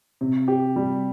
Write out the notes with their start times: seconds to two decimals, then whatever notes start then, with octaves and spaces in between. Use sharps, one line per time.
0.21 C3
0.48 G4
0.76 G3